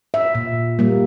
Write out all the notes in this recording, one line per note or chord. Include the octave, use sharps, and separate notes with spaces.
E5
A#2
G3 A#3